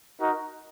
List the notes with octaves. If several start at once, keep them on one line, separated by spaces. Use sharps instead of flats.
D#4 F#4 A#4